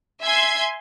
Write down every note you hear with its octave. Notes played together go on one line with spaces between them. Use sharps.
E5 G#5 C6 G#6